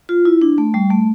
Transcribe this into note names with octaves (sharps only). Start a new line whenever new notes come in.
F4
E4
D4
A3
G3
A3